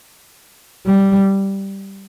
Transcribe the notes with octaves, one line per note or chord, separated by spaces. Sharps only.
G3